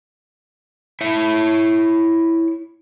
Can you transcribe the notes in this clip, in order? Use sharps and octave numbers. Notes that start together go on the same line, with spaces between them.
E4 C#5 E5